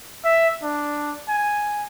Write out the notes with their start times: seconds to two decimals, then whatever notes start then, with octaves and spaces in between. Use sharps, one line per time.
0.24 E5
0.63 D4
1.28 G#5